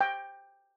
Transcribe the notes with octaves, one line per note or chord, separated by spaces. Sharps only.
G5